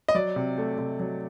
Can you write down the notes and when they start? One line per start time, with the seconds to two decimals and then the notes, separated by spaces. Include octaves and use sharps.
0.08 D#5
0.14 F#3 D5
0.36 C3
0.58 A3
0.78 C3
1.00 F#3